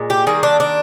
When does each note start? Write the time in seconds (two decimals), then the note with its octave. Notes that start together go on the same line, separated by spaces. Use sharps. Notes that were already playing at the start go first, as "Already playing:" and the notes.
Already playing: A#2 G#3
0.10 G4
0.26 D#3 G3 A#3 G#4
0.43 D4
0.60 D4